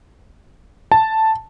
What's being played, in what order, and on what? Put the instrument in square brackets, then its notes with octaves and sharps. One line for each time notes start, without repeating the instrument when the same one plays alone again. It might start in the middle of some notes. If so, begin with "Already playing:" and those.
[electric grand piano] A5